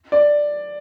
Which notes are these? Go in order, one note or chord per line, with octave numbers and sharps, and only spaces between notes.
D5